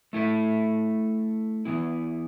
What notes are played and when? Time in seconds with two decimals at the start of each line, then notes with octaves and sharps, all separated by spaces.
0.13 A3 E4 A4 E5
1.65 E3 B3 E4